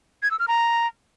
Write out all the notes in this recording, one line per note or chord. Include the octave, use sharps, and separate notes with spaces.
G#6
E6
F6
A#5